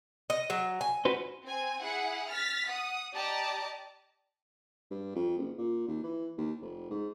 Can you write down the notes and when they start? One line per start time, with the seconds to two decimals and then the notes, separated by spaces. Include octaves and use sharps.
0.30 D#5
0.50 F#3
0.81 G#5
1.05 F#4 B4 C5
1.44 C4 G#5
1.83 E4 G#4 F#5
2.30 F6 A6 B6
2.68 F#5 D#6
3.13 G4 D5 D#5 A5 A#5 D6
4.90 G2
5.15 F2
5.37 F#1
5.58 A#2
5.88 D#2
6.04 E3
6.37 D#2
6.61 F1
6.91 G#2